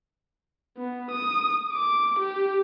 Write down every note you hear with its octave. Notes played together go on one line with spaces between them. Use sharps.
B3
D#6
D6
G4